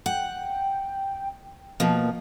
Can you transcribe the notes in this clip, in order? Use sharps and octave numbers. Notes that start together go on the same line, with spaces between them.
F#5 G5
B2 F3 A#3